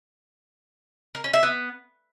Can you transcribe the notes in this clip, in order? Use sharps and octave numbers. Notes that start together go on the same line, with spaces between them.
A#4
C#4
E5
B3